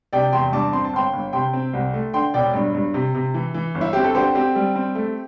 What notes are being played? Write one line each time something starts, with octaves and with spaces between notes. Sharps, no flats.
C3 D5 G5
E2 G5 C6
G2 A5 D6
C4 C6
A5
G1 G5 C6
G1
C3 G5 C6
C4
C2
A3
D3 G5 C6
E1 D5 G5
G2
G2
C3
C3
E3
E3
G1
E4
C4 G4
A4
D3 G4 C5
C4 G4
G3
C4
A3